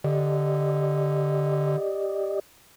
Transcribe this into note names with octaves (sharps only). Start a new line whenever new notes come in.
D3 G4 D5 D#5